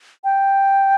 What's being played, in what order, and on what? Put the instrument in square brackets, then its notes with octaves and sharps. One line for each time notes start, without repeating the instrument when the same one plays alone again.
[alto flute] G5